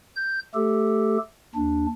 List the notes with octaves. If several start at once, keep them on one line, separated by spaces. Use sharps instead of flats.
G6
A3 G4 A4
D#2 D4